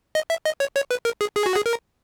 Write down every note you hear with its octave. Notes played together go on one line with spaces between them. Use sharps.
D#5
E5
D#5
C#5
C#5
B4
A#4
G#4
G#4
F#4
G#4
A#4